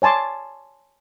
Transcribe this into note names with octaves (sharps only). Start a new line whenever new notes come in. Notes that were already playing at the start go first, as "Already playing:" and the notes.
C#5 G#5 A5 C6 D6